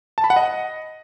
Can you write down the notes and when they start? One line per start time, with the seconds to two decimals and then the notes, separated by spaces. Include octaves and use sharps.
0.18 A5
0.24 B5
0.30 F#5
0.36 D#5